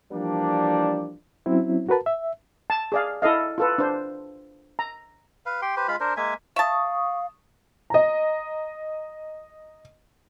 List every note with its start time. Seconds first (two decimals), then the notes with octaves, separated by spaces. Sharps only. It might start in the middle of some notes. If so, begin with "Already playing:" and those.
0.13 E3 F3 G3 A#3 D4
1.46 F#3 C4 C#4 E4
1.89 F#4 A#4 B4 A5
2.06 E5
2.70 A5
2.92 G#4 D5 F5
3.22 E4 A4 D#5 F5
3.58 F4 A4 B4
3.78 D4 C5
4.79 A#5
5.46 B4 F5
5.62 G4 G5 C6
5.77 G4 B4 C5
5.88 G#3 F4 F5 B5
6.00 D4 A#4 C5
6.17 G#3 A#3 E5 G#5
6.56 E5 F5 A5 C#6 D#6
7.90 D#5 A#5